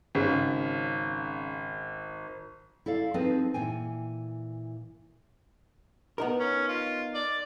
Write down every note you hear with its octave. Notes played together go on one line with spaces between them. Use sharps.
G#1 C#3
E4 A4 D5 F5
F3 C4 D#4 G#4 B4
A#2 E3 G5 G#5
B3 D#4 A#4
C#4
F4
D5